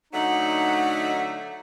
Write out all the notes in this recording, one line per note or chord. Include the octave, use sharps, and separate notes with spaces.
D3 F#3 A3 D#4 F#5